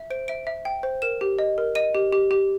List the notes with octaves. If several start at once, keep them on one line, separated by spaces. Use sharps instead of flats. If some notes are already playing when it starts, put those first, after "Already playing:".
Already playing: E5
C5 D7
E5 D7
E5
G5
C5
A#4 E7
G4
D#5
A#4
D#5 D#7
G4
G4
G4